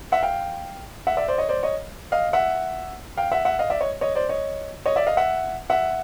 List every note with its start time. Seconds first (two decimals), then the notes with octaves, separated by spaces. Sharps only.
0.12 E5 F#5
0.23 F5 G5
1.07 E5 F#5
1.17 D5 E5
1.28 C5 D5
1.38 C#5 D#5
1.49 C5 D5
1.63 C#5 D#5
2.12 D#5 F5
2.33 E5 F#5
3.17 F5 G5
3.32 E5 F#5
3.45 E5 F#5
3.59 D#5 F5
3.70 D5 E5
3.81 C#5 D#5
4.01 C#5 D#5
4.15 C5 D5
4.29 C#5 D#5
4.86 C#5 D#5
4.96 D5 E5
5.07 D#5 F5
5.17 E5 F#5
5.70 E5 F#5